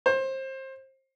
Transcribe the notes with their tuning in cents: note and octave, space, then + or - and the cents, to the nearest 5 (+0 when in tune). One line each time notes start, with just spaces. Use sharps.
C5 +25